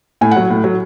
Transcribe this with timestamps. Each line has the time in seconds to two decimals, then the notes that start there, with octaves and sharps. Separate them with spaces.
0.21 A2 G#5
0.31 F#5
0.36 F#3
0.50 A2
0.64 F#3